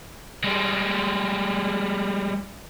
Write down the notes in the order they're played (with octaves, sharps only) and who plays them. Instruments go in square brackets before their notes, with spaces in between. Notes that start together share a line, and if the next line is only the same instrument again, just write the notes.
[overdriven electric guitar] G3 G#3